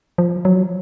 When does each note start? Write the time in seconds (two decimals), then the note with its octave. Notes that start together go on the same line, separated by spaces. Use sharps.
0.18 F3
0.45 F#3